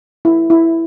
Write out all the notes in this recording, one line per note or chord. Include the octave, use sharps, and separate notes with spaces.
E4
E4